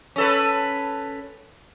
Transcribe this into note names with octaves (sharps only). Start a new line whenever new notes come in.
C#4 A4 B4